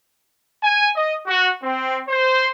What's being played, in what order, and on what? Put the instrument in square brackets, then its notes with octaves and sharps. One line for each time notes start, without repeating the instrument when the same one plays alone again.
[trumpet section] G#5
D#5
F#4
C4
C5